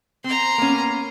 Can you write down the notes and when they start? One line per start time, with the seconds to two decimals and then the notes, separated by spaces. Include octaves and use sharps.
0.24 C4 A#5 C6
0.58 A#3 B3 C#4